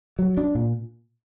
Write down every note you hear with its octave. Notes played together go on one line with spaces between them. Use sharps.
F#3
D4
A#2